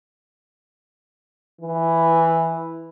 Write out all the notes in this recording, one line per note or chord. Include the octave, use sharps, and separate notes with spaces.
E3